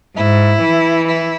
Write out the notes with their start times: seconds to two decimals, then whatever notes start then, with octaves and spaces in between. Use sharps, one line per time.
0.16 G#2 E4
0.61 E3
1.07 E4